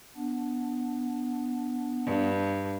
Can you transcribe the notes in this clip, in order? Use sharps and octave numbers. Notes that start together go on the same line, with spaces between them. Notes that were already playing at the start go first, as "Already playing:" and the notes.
B3 D4
G2